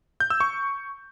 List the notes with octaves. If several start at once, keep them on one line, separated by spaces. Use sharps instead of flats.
G6
E6
C#6